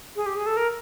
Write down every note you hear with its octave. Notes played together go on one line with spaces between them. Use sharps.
G#4
G4
G#4
A4
A#4